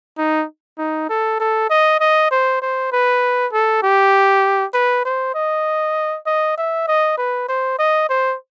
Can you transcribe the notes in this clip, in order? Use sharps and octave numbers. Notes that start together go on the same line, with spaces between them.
D#4
D#4
A4
A4
D#5
D#5
C5
C5
B4
A4
G4
B4
C5
D#5
D#5
E5
D#5
B4
C5
D#5
C5